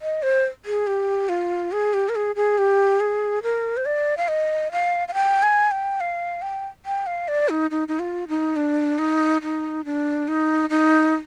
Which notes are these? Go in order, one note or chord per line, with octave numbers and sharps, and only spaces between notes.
D#5
C5
G#4
G4
F4
G#4
G4
A#4
G#4
G#4
G4
G#4
A#4
C5
D5
F5
D#5
F5
F5
G5
G#5
G5
F5
G5
G5
F5
D5
D#4
D#4
D#4
F4
D#4
D4
D#4
D#4
D4
D#4
D#4